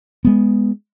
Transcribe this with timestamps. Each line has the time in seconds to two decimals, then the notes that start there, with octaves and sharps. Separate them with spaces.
0.25 G#3 B3